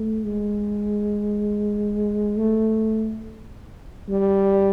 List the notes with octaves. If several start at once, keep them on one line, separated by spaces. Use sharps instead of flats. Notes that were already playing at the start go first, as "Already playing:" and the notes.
Already playing: A3
G#3
A3
G3